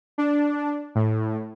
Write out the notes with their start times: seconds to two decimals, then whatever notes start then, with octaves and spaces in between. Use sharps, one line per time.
0.18 D4
0.95 A2